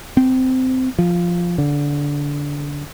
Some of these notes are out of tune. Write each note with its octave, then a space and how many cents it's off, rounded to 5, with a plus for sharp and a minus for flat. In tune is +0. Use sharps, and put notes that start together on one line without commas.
C4 -20
F3 +0
D3 -20